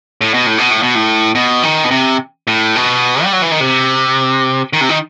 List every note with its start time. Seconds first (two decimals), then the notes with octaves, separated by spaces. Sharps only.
0.21 A2
0.34 B2
0.46 A2
0.58 B2
0.71 A2
0.83 B2
0.95 A2
1.35 B2
1.63 D#3
1.84 B2
1.91 C3
2.47 A2
2.75 B2
3.23 G3
3.33 F#3
3.42 E3
3.51 D#3
3.60 C3
4.73 D#3
4.81 C3
4.89 D#3